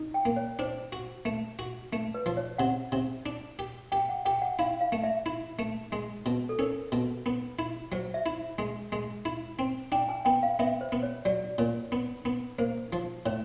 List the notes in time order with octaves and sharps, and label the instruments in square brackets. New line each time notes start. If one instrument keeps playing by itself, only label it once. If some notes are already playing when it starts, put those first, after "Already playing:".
Already playing: [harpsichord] D#4
[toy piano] G5
[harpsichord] A#3
[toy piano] C#5
[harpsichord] D4 [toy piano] C5
[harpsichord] F#4
A3
F#4
A3
[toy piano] B4
[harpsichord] F3
[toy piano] C#5
[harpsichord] C3 [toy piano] F#5
[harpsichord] C3
D4
G4
[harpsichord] G4 [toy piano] G5
[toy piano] F#5
[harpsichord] G4 [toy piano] G5
[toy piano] F#5
[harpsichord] E4 [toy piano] F5
[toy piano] F5
[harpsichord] A3
[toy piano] E5
[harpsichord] E4
A3
G#3
B2
[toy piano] A4
[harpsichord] C#4 [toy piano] A#4
[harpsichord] B2
B3
E4
[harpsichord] F#3 [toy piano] C5
[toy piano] E5
[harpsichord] E4
G#3
G#3
E4
C4
[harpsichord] D4 [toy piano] G5
[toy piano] G#5
[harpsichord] B3 [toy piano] G5
[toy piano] F5
[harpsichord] B3 [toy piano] E5
[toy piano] C5
[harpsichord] B3
[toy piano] C#5
[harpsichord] F#3 [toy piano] D5
[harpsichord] A#2 [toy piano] C#5
[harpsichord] B3
B3
[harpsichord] A#3 [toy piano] C5
[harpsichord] F3
[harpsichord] A2 [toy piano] C#5